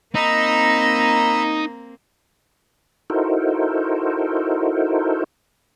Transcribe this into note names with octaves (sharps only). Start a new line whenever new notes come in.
A#3 C4 D#4 D#5 A#5 B5 E6
D#4 E4 F#4 A4 A#4 C5